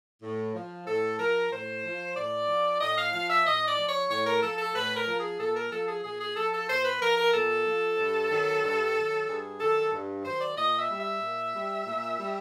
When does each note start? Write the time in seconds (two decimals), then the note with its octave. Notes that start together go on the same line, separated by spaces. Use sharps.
0.23 A2
0.54 F3
0.87 A2 A4
1.19 F3 A#4
1.52 A2 C5
1.84 F3
2.16 A2 D5
2.49 F3
2.81 A2 D#5
2.97 F5
3.13 F3 F5
3.29 E5
3.46 A2 D#5
3.67 D5
3.78 F3
3.89 C#5
4.10 A2 C#5
4.26 A#4
4.43 F3 A4
4.58 A4
4.75 A2 B4
4.97 A#4
5.07 F3
5.18 G#4
5.40 A#2 A4
5.56 A#4
5.72 F3 A4
5.88 G#4
6.04 A#2 G#4
6.20 G#4
6.37 F3 A4
6.53 A4
6.69 A#2 C5
6.85 B4
7.01 F3 A#4
7.18 A#4
7.34 A#2 A4
7.66 F3
7.99 G2
8.31 D#3 F#3
8.63 G2
8.95 D#3 F#3
9.28 G2 G#4
9.60 D#3 F#3 A4
9.93 G2
10.25 D#3 F#3 C5
10.41 D5
10.57 A#2 D#5
10.79 E5
10.90 G3
11.00 E5
11.22 A#2
11.55 G3
11.86 A#2
12.19 G3